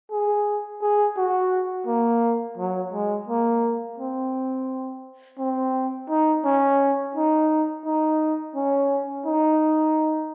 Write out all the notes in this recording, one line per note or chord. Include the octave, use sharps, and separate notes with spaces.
G#4
G#4
F#4
A#3
F#3
G#3
A#3
C4
C4
D#4
C#4
D#4
D#4
C#4
D#4